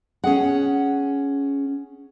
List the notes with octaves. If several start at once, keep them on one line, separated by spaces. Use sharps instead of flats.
C#4 G#4 F#5